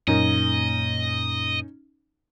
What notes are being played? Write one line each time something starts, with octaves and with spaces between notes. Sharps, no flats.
F#2 A#2 A#3 C#4 D#4 D#5